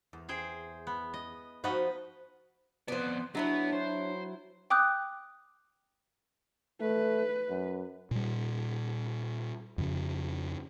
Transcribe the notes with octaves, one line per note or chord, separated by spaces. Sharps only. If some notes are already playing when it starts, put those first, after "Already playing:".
E2
G#4 C5 G5
B3
D#5
F3 D#4 F#4 B4 D#5
F2 B3 C5 D5
F#3 B3 D4 E4 C#5
C5
G5 D6 D#6 F#6 G6
A3 B4
F#2
A#2 G3
F2 C#3